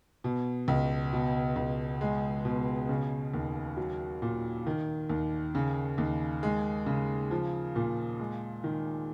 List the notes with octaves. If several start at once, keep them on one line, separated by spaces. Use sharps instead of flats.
B2
C#2
B2
C#2
G#3
B2
C#3
D#2
F#3
A#2
D#3
D#2
C#3
D#2
G#3
C#3
F3
A#2
G#3
D#3